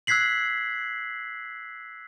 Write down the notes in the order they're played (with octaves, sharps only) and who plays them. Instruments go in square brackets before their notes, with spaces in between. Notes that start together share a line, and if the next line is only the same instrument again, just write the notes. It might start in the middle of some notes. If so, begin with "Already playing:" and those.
[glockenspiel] E6 F#6 G#6 B6 C7 F#7